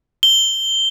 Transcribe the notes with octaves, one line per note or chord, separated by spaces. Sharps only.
G7